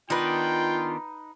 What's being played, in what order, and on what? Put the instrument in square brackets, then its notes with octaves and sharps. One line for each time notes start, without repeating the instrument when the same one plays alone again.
[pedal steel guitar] D#3 B3 D4 [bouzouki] D#4 B4 [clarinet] F4 [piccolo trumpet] G5